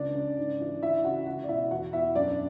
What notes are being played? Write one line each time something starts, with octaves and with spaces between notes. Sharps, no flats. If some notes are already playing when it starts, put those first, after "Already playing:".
Already playing: C#2 D3 D4 D5
C#3
G#2
E3
D2 E4 E5
C#3 F#4 F#5
C#2 F#4 F#5
D5
B2 E4 E5
E2 F#4 F#5
B2 E4 E5
F#2 D4 D5